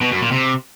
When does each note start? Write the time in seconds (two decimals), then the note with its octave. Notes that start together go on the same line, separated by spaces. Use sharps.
0.01 B2
0.11 F#2
0.21 A#2
0.32 C3